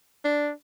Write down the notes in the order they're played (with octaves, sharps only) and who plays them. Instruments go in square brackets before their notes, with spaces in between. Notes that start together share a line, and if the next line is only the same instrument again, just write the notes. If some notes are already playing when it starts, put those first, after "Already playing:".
[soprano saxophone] D4